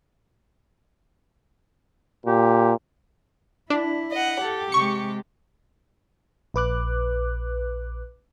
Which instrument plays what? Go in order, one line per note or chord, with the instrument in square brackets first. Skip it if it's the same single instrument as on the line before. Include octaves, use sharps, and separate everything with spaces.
[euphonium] A#2 [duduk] G4
[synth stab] D4 [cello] E4
[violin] D#5 F#5
[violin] G4 [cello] A4
[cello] C3 G#3 [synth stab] C#6 C#7
[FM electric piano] A#1 B4 D6 F#6